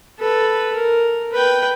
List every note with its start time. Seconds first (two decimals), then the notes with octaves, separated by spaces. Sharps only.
0.19 A4 B4
0.76 A#4
1.32 B4 G5